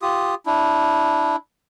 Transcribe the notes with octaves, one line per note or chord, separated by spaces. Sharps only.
F4 G4 D#6
D4 E4